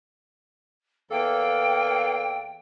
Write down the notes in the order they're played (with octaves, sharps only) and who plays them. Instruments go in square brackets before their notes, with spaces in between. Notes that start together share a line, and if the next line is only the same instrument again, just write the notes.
[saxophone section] E2 A#3 A4 [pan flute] G5